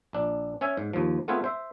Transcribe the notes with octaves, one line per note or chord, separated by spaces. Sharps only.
A#1 D4
C#4 C#5 E5 G#5
G#2
D#2 F3
A3 B3 C4 F4 G#4 B4
C5 E5